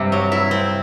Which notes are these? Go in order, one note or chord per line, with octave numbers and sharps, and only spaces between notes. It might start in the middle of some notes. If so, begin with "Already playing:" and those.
Already playing: G2 C3 C4
F#3
E4
C4